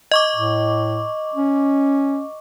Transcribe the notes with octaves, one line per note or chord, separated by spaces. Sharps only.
D#5 C#6 D6
A2
C#4